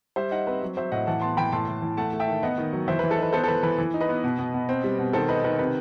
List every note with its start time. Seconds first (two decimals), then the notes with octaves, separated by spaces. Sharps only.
0.16 G3 C5 E5
0.31 D#4 D#5 F#5
0.47 C4 B4
0.62 F#3
0.77 F#3 C5 E5
0.92 A2 D#5 F#5
1.07 E3 F#5 A5
1.22 B3 A5 C6
1.37 E3 G5 B5
1.52 A2 A5 C6
1.68 A2
1.82 E3
1.97 A3 F#5 A5
2.13 A3
2.20 E5 G5
2.28 D#3
2.43 B3 D#5 F#5
2.58 D#3
2.73 F#3
2.88 E3 C5 E5
2.99 E3 B4
3.11 A4
3.18 D#4 B4
3.33 B3 A4 C5
3.44 A4
3.48 E3 B4
3.63 E3 B4
3.78 E3
3.94 D#4
4.01 B4 D#5
4.09 B3
4.24 B2
4.39 B2
4.54 B2
4.69 C4
4.84 G3
4.98 B2
5.13 D#3 A4 C5
5.29 D#4 B4 D#5
5.44 D#3 B4
5.59 C3 B4